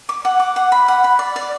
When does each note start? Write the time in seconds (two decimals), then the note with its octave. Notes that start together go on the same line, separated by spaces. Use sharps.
0.09 D6
0.25 F#5
0.39 D6
0.56 F#5
0.72 B5
0.88 F#5
1.04 B5
1.19 D5
1.36 D5